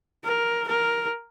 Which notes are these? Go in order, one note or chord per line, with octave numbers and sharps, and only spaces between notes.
A#4
A#4